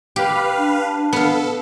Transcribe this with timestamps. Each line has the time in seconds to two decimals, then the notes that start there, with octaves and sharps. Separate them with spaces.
0.16 G4 B4 F5
0.58 D4
1.13 B3 A4 F5